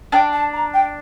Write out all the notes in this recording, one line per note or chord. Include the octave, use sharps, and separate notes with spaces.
D4 G5
A5
A#5
G5